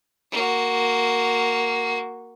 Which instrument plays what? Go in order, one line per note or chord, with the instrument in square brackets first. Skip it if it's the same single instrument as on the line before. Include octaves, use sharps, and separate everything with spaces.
[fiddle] A#3 F#4